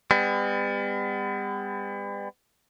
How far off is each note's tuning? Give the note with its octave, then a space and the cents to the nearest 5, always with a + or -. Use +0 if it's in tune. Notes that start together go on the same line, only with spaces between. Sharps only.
G3 +40 B3 +35